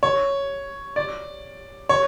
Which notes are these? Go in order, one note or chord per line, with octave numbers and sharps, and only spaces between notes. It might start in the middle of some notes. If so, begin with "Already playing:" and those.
C#5
D5
C#5